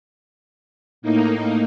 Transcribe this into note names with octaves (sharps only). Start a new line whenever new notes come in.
A2 A#3 D#4